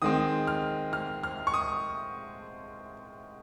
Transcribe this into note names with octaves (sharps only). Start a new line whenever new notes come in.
D#3 G#3 C4 D#6
F6
F6
F6
C#6
D#6